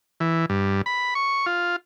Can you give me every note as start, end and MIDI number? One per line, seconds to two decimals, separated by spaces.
0.20 0.46 52
0.50 0.82 43
0.86 1.14 83
1.15 1.46 85
1.46 1.76 65